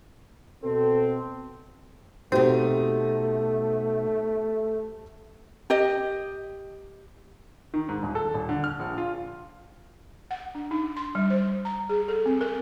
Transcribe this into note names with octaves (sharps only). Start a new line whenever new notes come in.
B2 C4 A4
B2 A3 C4 D#4 F#4 G4 C5
G4 D#5
D#3
G#2
D#1
A4
D#1
D3
F6
A#1
F4
F#5
D4
D#4
C6
G3
C5
A#5
G#4
A4
C4
A#4